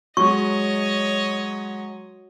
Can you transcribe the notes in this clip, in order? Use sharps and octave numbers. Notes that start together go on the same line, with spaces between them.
F#3 G#3 F#4 C#5 D#5 C#6